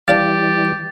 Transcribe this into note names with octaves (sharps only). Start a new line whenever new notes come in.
E3 G3 D4 G4 D5 F5 A6